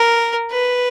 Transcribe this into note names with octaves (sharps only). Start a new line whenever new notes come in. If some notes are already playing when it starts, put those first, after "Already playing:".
Already playing: A#4
B4